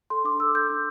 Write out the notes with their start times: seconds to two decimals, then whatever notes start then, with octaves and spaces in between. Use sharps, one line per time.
0.10 A4 C6
0.24 D4 D6
0.40 A4 E6
0.55 A4 G6
0.70 D4